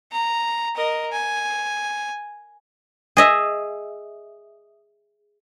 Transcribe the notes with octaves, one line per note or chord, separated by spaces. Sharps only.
A#5
A#4 D#5
G#5
G#4 D#5 E5